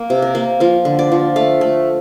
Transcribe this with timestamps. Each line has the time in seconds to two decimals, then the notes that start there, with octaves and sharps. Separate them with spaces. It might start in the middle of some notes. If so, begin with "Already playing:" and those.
Already playing: A#3
0.10 C3
0.22 A#4
0.35 A#3
0.60 F3 A#4
0.85 D3
0.99 D5
1.12 F3
1.36 A3 F5
1.61 A3